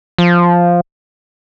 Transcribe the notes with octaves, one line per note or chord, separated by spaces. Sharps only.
F3